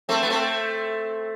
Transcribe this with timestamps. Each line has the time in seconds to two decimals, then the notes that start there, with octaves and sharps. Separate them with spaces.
0.09 A3 C4
0.23 B3
0.30 A3 C4